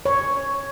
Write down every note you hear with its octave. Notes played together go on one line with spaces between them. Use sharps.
C#5